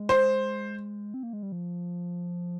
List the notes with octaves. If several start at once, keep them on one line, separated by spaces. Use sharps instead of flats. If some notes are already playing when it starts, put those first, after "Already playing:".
Already playing: G#3
C5
C4
A#3
G#3
G3
F3